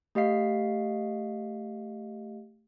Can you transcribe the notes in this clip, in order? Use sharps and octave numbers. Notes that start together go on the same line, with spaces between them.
A3 G4 D#5 F5 C7